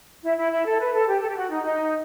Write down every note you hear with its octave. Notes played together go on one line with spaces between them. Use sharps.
E4
E4
E4
A4
B4
A4
G4
A4
G4
F#4
D#4
D#4